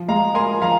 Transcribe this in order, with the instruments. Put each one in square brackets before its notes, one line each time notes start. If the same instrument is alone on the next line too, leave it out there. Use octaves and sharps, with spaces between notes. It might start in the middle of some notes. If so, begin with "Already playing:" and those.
Already playing: [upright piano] F3
[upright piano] G#3 [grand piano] F5 A#5
[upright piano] A#4 [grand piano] G#5 C6
[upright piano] F3 [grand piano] F5 A#5